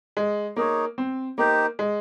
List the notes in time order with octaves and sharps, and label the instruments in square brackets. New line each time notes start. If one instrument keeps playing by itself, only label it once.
[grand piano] G#3
[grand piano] A#3 [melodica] D#4 G#4 C#5
[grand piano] C4
[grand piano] A#3 [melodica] D#4 G4 C5
[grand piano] G#3